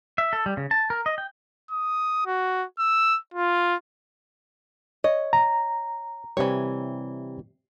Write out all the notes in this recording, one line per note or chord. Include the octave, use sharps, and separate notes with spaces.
E5
A4
G3
C#3
A5
A#4
D#5
G5
D#6
F#4
E6
F4
C#5 D#5
A#5
C3 E3 G3 C#5